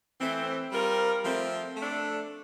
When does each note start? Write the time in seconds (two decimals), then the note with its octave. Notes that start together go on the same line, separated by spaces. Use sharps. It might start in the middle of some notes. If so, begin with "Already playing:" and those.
0.20 E3 A3 C4
0.72 G3 C4 F4 A#4
1.25 F3 A3 C4
1.77 A3 D4 A4